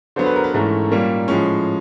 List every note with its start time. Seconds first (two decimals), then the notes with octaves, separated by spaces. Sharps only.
0.16 D3 F#3 B3 C5
0.26 B4
0.36 A#4
0.44 B4
0.54 G#2 E3 A3 C#4 A#4
0.91 A#2 G3 A#3 C#4
1.28 A2 F3 G#3 C#4